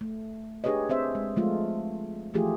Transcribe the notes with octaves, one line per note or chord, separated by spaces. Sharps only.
A3
D4 G4 G#4 B4 C#5 D#5
C4 C5 E5
G#3
F3 G#3 A3 F4
E3 F3 A3 F4 G4 G#4